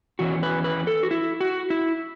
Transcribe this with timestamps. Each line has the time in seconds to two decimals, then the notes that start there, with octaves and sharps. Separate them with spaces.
0.19 E2 E3 C#4 F#4
0.43 B4
0.64 B4
0.87 A4
1.03 F#4
1.11 E4
1.41 F#4
1.70 E4